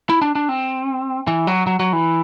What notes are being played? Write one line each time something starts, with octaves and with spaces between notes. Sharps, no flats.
E4
D4
D4
C4
E3
F#3
F#3
F#3
E3